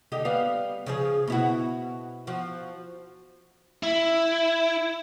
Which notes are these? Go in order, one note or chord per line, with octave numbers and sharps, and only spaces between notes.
D3 D#4 G4
G3 B3 F5
C#3 F3 G#4
B2 E4 F#4
F3 F#4
E4